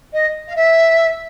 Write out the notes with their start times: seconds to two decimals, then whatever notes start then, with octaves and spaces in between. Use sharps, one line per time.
0.13 D#5
0.47 F5
0.55 E5